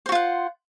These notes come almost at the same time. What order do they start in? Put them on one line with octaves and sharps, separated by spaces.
C5 F#4 F4 F#5